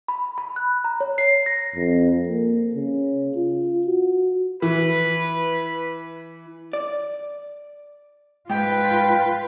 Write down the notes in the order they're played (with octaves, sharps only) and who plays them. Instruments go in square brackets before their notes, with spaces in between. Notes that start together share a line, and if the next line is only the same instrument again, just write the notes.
[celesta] B5
B5
F#6
A#5
C#5
C7
A#6
[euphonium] F2
A#3
C#3
F4
F#4
[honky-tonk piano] E3 [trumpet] B4
[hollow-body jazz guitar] D5
[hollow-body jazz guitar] G#2 [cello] F4 B4 [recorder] G5